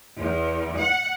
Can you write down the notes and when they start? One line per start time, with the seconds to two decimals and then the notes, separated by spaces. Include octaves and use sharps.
0.18 E2
0.78 F#5